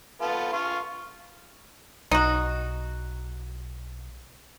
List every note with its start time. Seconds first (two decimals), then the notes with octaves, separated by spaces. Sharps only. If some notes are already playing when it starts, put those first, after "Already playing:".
0.21 B3 F4 A4
0.53 F4 F5 C#6
2.11 B1 D#4 F#4